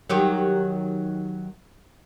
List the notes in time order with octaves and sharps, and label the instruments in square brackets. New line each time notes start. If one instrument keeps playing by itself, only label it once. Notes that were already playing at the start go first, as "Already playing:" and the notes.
[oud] D#3 F#3 G4